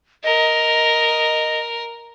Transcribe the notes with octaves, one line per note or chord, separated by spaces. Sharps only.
A#4 D#5